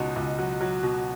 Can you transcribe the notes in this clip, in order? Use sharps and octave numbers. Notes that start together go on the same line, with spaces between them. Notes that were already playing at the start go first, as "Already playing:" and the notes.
Already playing: C#2 B2 D#4
C#2
F#3
F#3
B2